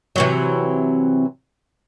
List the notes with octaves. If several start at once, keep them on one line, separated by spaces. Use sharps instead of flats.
C3 E3 F#3